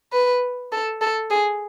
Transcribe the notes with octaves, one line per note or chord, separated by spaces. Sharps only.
B4
A4
A4
G#4